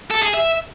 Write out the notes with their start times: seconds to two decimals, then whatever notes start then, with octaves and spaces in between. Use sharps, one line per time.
0.11 A4
0.22 G#4
0.34 E5